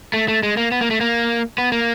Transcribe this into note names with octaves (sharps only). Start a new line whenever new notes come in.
A3
A3
G#3
A#3
B3
A#3
A3
A#3
B3
A#3